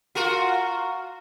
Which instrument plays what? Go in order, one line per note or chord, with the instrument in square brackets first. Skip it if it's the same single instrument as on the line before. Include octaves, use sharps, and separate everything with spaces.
[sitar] F4 F#4 A#4